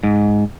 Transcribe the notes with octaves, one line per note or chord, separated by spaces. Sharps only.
G#2